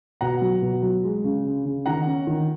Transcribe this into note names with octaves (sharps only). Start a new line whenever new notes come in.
B2 F#5 A#5
F#3
B2
F#3
G#3
C#3
C#3
C#3
D#3 F#5 A#5
C#4
D#3